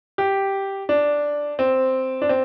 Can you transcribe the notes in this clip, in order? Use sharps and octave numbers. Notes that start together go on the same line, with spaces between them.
G4
D4
C4
D4
C4